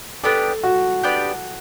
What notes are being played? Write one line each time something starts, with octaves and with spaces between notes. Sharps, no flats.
B3 D4 G4 A4 D5
F#4
B3 D4 G4 D5